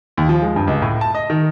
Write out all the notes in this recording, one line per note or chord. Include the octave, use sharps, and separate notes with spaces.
D#2
F3
G#3
G2
C#2
A2
A5
D#5
D#3